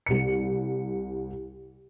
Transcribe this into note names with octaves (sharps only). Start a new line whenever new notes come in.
C2 C#7